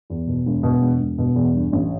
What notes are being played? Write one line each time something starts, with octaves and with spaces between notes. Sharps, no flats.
E2
B2
E1
B2
E1
E1
B2
E2
G2
A1